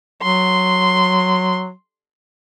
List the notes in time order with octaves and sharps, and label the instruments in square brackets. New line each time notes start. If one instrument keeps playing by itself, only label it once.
[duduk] F#3 [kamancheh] C6